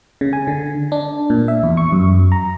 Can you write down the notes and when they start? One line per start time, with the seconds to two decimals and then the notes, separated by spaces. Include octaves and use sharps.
0.21 C#3
0.33 G#5
0.47 D3
0.92 D4
1.30 A#2
1.48 E5
1.63 E2
1.77 C#6
1.92 F#2
2.32 A#5